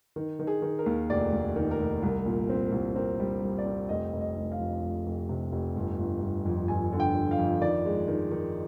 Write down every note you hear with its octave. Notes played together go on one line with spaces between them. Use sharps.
D#3
D#3
G#4
D#3
A#4
D#2
F1 D5
D#2
D#3
A#4
F1
C2
A#2
C4
C2
C4 A#4
G3
G3
D5
C4
F1 D#5
F1
D#5
F1
F5
F2
F1
F1
C3
F1
G1
G1
G1
F2
G1 G#5
D3
G5
D3
F5
F2
D#3 D5
G#3
D#3
D#3